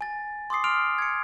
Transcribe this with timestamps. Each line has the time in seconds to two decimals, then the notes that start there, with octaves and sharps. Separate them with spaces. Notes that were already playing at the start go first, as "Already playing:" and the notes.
0.01 G#5 A6
0.50 C6 D6 D#6 C7
0.64 C6 D#6 F6 D7 F7
0.98 G#6 C#7